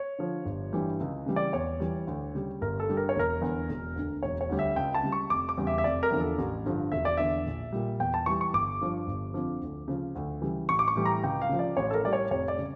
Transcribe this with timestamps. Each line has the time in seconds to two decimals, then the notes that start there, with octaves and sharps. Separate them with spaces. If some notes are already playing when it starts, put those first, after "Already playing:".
Already playing: C#5
0.19 D3 F3
0.45 G1
0.73 G2 E3 G3
1.00 C#2
1.26 C#3 E3 G3
1.36 D5
1.53 E2 C#5
1.80 E3 G3
2.07 D2
2.35 C#3 G3
2.61 G1 A#4
2.80 A4
2.89 G2 D3 G3
2.97 A#4
3.09 C#5
3.16 E1 A#4
3.42 E2 D3
3.69 E1
3.96 D2 D3
4.23 E1 C#5
4.41 C#5
4.49 D2 D3 G3
4.59 E5
4.76 C#2 G5
4.94 A5
5.03 C#3 G3
5.12 C#6
5.30 F1 D6
5.49 D6
5.58 E2 C#3 G3
5.67 E5
5.78 E5
5.84 F1 D5
6.03 A#4
6.11 E2 D3 F3
6.21 A4
6.38 A1
6.66 G2 D3 F3
6.92 E1 E5
7.05 D5
7.17 E2 D3 E5
7.45 A#1
7.72 A#2 G3
8.00 E2 G5
8.14 A5
8.26 E3 G3 C#6
8.41 C#6
8.54 G1 D6
8.81 G2 F3
9.07 G1
9.34 F2 D3 F3
9.62 D2
9.88 C#3 F3
10.15 D2
10.42 C#3 E3 G3
10.69 A1 C#6
10.79 D6
10.88 C#6
10.96 A2 E3 G3
11.06 A#5
11.23 C#2 G5
11.42 F5
11.49 C#3 F3
11.59 D5
11.77 A1 C#5
11.90 A4
11.94 A#4
12.04 A2 G3 D5
12.13 C#5
12.30 F1 C#5
12.48 D5
12.59 C#3